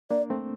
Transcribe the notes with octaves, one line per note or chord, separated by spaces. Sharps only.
A#3 D4 D5
A3 C4